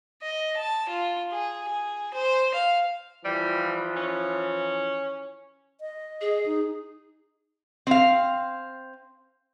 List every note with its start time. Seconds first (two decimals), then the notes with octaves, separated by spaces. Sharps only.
0.22 D#5
0.57 A5
0.89 F4
1.32 G#4
1.68 G#4
2.14 C5
2.54 F5
3.25 E3 F3 G3
3.96 C#4
5.81 D#5
6.21 G#4
6.46 D#4
7.87 C4 F5